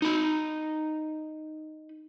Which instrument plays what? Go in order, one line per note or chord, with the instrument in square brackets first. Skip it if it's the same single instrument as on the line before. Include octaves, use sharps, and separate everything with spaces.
[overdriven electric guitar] D#4 B5